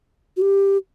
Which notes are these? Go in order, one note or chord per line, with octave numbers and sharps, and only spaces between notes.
F#4
G4